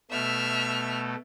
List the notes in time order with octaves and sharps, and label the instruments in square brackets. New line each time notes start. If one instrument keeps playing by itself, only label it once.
[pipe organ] B2 A3 [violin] E5 F6